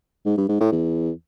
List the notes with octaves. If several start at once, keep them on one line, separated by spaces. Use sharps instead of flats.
G#2
G2
G#2
A2
E2